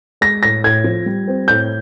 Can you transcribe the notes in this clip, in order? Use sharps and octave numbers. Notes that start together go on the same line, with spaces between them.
G#3 A#6
A2 A#6
A2 G#6
F3
G3
C4
A2 G6